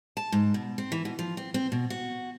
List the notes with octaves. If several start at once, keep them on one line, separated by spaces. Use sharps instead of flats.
A5
G#2
B2
C4
E3
B2
F3
C4
C4
B2
F#4